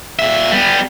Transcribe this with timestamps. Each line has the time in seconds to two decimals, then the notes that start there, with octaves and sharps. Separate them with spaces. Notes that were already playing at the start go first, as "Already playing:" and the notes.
0.19 A#2 E5
0.51 G3 B3